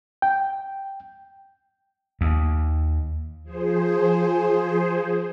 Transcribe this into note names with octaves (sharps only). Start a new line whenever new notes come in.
G5
D#2
F3 G#4 C5